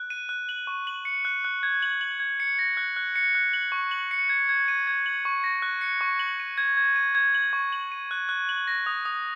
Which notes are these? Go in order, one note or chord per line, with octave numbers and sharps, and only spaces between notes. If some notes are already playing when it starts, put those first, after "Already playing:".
Already playing: F#6
D#7
F#6
F#7
C#6
F#7
C#7
F#6
F#6
G#6
F#7
F#7
G#6
C#7
A#6
F#6
F#6
C#7
F#6
F#7
C#6
F#7
C#7
G#6
G#6
D#7
G#6
F#7
C#6
A#6
F#6
C#7
C#6
F#7
D#7
G#6
G#6
D#7
G#6
F#7
C#6
F#7
D#7
F#6
F#6
F#7
A#6
D#6
D#6